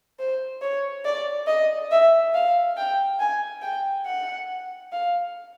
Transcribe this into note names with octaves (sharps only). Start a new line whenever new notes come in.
C5
C#5
D5
D#5
E5
F5
G5
G#5
G5
F#5
F5